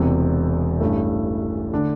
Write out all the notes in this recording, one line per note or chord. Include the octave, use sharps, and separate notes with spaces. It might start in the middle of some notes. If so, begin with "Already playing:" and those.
Already playing: E1 E2 C3
A1 G2 E3 A3
D3 A3 D4